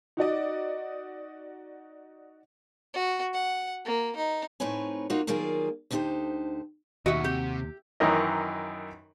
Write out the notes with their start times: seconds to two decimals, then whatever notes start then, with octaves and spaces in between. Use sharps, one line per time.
0.17 D#4 F#4 D5 D#5
2.94 F#4
3.34 F#5
3.85 A#3
4.16 D#4
4.60 A2 C4 D#4 B4 C#5 G#5
5.10 A#3 D#4 F4 F#4
5.27 D#3 F#3 G3 A#3 F4 G#4
5.91 D2 D3 D#4 F4 G4 C5
7.06 D#2 B2 D#3 F#4 D#5 E5 F#5
7.24 C3 G4
8.00 F#2 D#3 E3 A#4 D#5